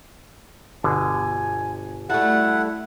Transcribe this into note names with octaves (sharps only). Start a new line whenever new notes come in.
G1 B2 D3 G#5
G3 A3 E4 F#4 A4 F#5